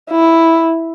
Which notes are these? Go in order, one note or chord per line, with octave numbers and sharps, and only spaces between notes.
E4